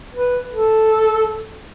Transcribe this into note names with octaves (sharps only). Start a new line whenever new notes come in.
B4
A4